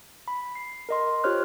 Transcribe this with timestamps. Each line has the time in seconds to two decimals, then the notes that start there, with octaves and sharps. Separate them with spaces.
0.28 B5
0.55 C7
0.89 A#4 D#5 C6
1.24 F4 G4 C5 C#5 F6 F#6